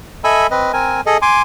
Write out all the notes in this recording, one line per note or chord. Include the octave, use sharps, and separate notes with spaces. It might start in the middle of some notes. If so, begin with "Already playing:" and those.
A4 D#5 E5 G#5 B5 E6
C4 B4 D#5
C4 A#4 G#5
G#4 A4 D#5
G#5 C6 D6